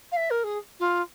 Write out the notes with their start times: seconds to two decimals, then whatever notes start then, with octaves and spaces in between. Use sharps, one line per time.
0.11 F5
0.16 E5
0.30 A#4
0.43 G#4
0.79 F4